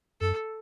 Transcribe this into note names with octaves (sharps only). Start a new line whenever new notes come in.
F#2 A4